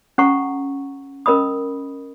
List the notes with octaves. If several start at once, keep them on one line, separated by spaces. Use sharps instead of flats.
C#4 A4 F#5 A#5 C#6
C#4 A#4 D#5 B5 D#6